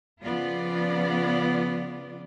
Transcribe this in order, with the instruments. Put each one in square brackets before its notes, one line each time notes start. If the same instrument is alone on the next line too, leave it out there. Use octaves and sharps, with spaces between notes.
[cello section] C#3 F3 B3 F4 D5